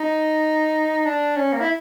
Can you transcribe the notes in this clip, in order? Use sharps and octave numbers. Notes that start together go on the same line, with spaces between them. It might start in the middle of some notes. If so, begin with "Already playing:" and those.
Already playing: D#4
D4
C#4
A#3
E4